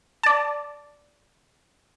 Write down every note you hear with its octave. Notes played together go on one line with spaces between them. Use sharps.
D5 A5